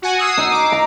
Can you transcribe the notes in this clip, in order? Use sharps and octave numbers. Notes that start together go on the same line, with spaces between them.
F#4 F#5 G#5
D#6 E6 C7
D#4
D6
A#5